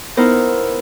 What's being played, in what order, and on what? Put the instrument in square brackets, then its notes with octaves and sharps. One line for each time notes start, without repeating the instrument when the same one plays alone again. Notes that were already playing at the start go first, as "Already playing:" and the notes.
[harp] B3 D#4 E4 A#4 C5